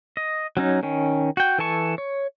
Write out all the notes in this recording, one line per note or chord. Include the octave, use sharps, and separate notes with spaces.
D#5
F#3 C#4 D#4
D#3 C#4
F#4 G5
E3 A4 G#5 A5 C#6
C#5